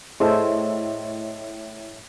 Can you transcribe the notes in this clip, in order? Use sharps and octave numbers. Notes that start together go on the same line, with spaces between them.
A2 G#4 A4 C5 C#5 D#5 E5 C6